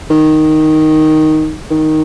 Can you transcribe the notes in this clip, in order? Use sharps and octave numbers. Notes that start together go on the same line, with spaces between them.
D#3
D#3